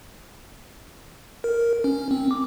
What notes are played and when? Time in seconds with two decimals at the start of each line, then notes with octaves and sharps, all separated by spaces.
1.44 A#4
1.84 C#4
2.11 C4
2.31 D6